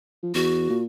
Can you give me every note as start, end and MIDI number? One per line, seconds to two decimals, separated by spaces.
0.23 0.31 53
0.35 0.66 40
0.35 0.80 66
0.70 0.85 46